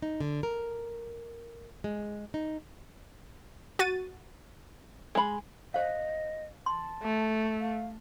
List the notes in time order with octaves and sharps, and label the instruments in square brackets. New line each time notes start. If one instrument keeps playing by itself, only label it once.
[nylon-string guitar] D#4
D3
A#4
G#3
D#4
[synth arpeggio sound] F#4 A6 D#7
[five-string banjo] G#3 B5
[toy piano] C5 F5 [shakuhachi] D#5
[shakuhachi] A5 [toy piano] C6
[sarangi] A3
[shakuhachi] F5